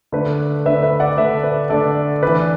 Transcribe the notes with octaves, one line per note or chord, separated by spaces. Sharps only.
D3 A3 D4 B4
D3 A3 D4 B4 E5
B4 E5
D5 F#5
D3 A3 D4 B4 E5
B4
D3 A3 D4 A4 D5
E3 D4 B4